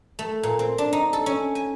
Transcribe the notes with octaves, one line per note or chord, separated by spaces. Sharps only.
A3
A#2
C4
D4
D#4
A4
C#4
G#5